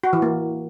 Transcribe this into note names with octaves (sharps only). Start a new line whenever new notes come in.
F#4
E3
A#3